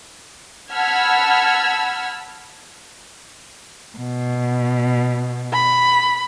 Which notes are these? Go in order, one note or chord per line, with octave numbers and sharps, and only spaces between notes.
F#5 A5 B5 E6 F6 G#6
B2
B5